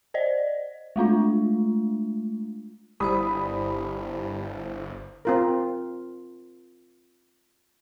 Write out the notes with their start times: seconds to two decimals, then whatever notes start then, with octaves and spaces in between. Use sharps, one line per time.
0.14 C5 D5 D#5
0.96 G#3 A3 D4 F4
3.00 G1 G3 E4 C5 B5 D#6
5.25 C4 F4 A#4